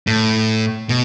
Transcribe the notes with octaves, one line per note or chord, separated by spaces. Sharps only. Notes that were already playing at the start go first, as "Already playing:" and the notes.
A2
B2